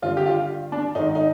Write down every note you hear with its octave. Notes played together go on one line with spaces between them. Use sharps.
G2 D3 F4
G4
F4
D4
G#2 D#3 D#4
D#4